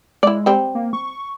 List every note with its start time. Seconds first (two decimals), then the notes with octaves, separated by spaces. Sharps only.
0.23 G#3 E4 D5
0.46 G3 C4
0.75 A#3
0.93 C#6